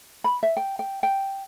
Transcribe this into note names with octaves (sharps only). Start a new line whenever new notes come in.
B5
E5
G5
G5
G5